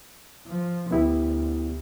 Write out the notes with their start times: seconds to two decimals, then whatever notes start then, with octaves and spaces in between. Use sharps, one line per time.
0.47 F3
0.91 D2 B3 E4 G4